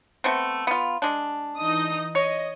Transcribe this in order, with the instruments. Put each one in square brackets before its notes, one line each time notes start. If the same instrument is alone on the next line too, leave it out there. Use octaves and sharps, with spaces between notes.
[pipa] A3 B3 C4
B3 F4
G#3 D4
[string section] E3 D#4 D#6
[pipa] C#5 [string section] D#5